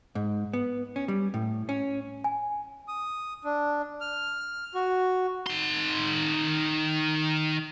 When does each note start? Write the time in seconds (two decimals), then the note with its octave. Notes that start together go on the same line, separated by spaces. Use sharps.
0.15 G#2
0.53 B3
0.96 C#4
1.08 G3
1.34 A2
1.69 C#4
2.24 G#5
2.88 D#6
3.44 D4
4.01 F6
4.74 F#4
5.46 D#3 C6